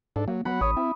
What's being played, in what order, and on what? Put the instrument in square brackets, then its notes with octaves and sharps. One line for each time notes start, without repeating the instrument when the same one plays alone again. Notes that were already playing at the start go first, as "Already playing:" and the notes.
[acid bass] G#2 [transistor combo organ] D4 A4
[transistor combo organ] F#3 [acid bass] A#3
[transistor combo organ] F#3 F#5 [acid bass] B3 [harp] B5
[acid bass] A1 [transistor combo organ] C#5 [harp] D#6
[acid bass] C4 [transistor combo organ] E4